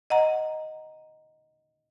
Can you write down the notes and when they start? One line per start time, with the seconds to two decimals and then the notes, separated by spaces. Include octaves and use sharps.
0.10 D#5 F#5 A#5